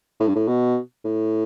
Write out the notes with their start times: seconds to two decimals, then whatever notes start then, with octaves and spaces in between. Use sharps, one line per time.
0.20 A2
0.28 G2
0.36 A2
0.48 B2
1.05 A2